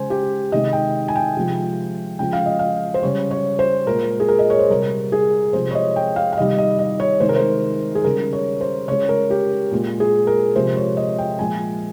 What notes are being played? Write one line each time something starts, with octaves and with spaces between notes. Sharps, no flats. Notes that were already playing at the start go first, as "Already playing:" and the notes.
Already playing: C#3 G#3 C5 G#5
G4
C3 D#3 G#3 D#5
G5
G#5
G5
C3 F3 G#3
C#3 F3 G#3 G5
F5
D#5
F5
C5
C#3 G3 C#5
C#5
C5
A#2 G#3 A#4
G#4
A#4
D#5
C#5
C5
C3 G3 A#4
G#4
C3 F3 G#3 C5
C#5
D#5
G5
F5
F5
C3 D#3 G3 D#5
D#5
D#5
C#5
C3 D#3 G#3 C5
A#4
C5
G#4
C#3 G3 A#4
C#5
C5
C#3 G#3 C#5
A#4
G4
A#2 G#3
G#4
A#4
C3 F3 G#3 C5
C#5
D#5
G5
A#2 F3 G#3 G#5